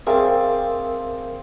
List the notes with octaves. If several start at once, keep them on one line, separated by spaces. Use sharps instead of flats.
C4 G#4 A#4 D5 E5 F5